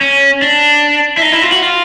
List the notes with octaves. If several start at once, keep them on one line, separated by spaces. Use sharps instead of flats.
C#4
D4
E4
D#4
E4
F4
F#4
F4